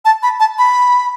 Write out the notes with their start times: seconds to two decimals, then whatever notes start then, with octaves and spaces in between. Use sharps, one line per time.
0.05 A5
0.23 B5
0.40 A5
0.58 B5